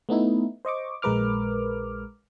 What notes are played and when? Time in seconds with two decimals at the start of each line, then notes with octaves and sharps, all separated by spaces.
0.09 A3 B3 D#4 E4
0.65 C5 D#5 C#6 D6
1.02 A#1 G#3 A#4 B4 D6 F6